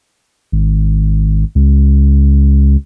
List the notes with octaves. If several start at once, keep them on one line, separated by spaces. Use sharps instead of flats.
G#1
C#2